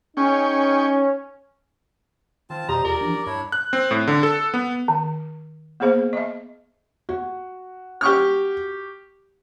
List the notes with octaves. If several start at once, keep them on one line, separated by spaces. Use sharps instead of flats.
C#4 D#4 G#4 G5 C#6
D#3 C4 F4 A5
F2 B2 G4 C5 D5 D#5 A#5
E2 F4 G#4 A#4 D5
E3 F3 D4
D6
G2 D4 E4 C#5
F#6
C4
A2
D3
A4
B3
D#3
A#3 B3 G#4 C5 F5
D#5 E5
F#4
G4 C#6 F6